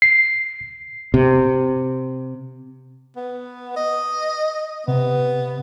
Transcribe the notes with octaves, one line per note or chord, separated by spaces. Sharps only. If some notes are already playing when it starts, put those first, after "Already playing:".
C7
C3
B3
D#5
C3 B3